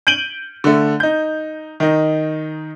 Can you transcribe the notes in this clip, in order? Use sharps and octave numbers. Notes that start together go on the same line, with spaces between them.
G6 D7 D#7 F#7 G7
D3 A3
D#4 G6
D#3 D#4